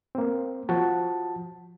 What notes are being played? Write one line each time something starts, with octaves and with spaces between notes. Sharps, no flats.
A#3 C4
F3 F#4 A5